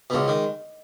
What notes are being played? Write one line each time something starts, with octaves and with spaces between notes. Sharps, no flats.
B2
C#2 C#3 G#3
D#3